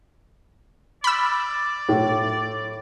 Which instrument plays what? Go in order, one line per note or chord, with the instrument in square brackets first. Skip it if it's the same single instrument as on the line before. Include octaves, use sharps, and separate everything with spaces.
[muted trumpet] D5 [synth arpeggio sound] B5 E6
[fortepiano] A2